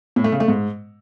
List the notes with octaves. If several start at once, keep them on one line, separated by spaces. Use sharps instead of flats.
A2
A3
C#3
A3
G#2